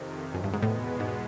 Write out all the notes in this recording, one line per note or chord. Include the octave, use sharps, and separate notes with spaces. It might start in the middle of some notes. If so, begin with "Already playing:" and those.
Already playing: F2 C3 D#3
E2 B2 G#3 B3
F#2
G2
G#2
A2
G#2